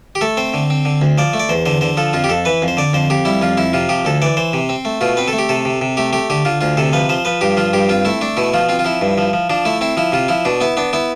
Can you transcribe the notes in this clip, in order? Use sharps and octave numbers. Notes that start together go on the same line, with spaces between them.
G4
A3 A4
C4 C5
D3
C4
D3
D2
F3 D5
A3
D5
E2 C5
D3 C5
D3 C5
F3 A4
F2 F4
G4
F2 A4
E3 B4
F2
C5
D3 D5
F2 C5
F2 G4
G3 E4
F2 F4
F2 E4
C3 F4
F3 G4
D2 A4
E3 D5
E3 C5
C3
C4
A3
B2 F4
C4 B4
A4
A3
G4
C3 A4
C3
C3
A3 G4
A3 G4
D3 G4
D3 F4
D2 F4
C3 A4
F3 B4
F3 C5
F3 B4
G2 G4
F3 F4
G2 G4
C4 F4
A3 E4
A3 D4
B2 E4
F3 F4
C4 F4
F4
F3 E4
G2
F3
F3
F3 D4
A3 E4
C4 E4
F3 E4
C3 F4
F3 E4
B2 D4
B3 E4
B3 D4
B3 E4